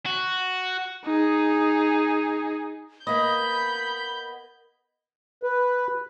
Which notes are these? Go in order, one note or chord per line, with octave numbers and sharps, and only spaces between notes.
F#4
D#4 G#4
A#3 B3 D#5 B5 G6
B4